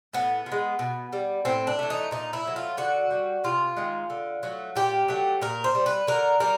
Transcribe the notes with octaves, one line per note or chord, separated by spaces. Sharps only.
A2 B3
F3
G#3
B2
G3
A2 C4
D4
E3 A3
D#4
A#2 D#4
E4
F#3 A3
F4
D3 F#4
G3
C3 F4
D#3 G#3
D3
F#3 A3
A#2 G4
F#3 A3
A#2 A#4
C5
G3
B4
D3 A#4
G3 A#4